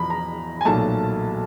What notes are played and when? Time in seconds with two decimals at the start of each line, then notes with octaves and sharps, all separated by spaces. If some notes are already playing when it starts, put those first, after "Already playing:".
Already playing: E2 F3 A#5 B5
0.10 A#5
0.61 G#5
0.65 B1 A#2 F#3 A3 A5